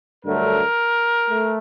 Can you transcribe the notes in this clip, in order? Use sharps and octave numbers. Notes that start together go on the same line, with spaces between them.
G2 D3 F#3 A3 A#4
A3